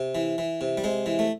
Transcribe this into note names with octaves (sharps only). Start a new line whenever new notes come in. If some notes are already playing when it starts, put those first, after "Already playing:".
Already playing: C3
E3
E3
C3
G3
C3 G#3
E3
A3